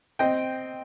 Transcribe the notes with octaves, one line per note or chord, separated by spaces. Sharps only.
C4 D#5 G5